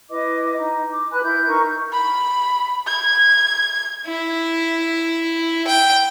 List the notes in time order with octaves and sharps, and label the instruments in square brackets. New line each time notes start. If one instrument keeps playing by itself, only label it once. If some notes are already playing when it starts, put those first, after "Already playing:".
[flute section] E4 B4 D#5 D6
D#4
D6
B4 G#5 B5 F#6
E4 G6
D#4 A#4 C#6
[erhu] B5
G#6
[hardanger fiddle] E4
G5